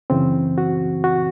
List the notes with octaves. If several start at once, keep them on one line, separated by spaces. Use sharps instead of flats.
F#2 C#3 E3 C4
F#4
F#4